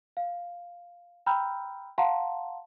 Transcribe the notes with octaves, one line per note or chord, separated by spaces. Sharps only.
F5
G5 A#5 B5 E6 F6 G6
F5 F#5 A5 A#5 C6